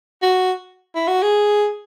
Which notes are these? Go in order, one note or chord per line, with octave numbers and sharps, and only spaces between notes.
F#4
E4
F#4
G#4